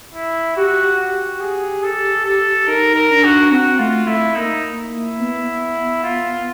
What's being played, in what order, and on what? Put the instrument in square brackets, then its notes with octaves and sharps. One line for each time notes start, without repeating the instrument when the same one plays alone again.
[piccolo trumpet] E4
[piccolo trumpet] F#4 [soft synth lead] G4
[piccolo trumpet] F#4
G#4
A4
A4
[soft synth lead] D#4 [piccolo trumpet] A#4
[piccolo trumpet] A#4
[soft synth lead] D4
[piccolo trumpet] F#4
[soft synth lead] C4 [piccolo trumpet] F#4
[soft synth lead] A3 [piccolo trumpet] F4
[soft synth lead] A3 [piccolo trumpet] E4
[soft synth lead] A#3 [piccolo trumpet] D#4
[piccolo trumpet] E4
[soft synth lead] B3
[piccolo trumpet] F4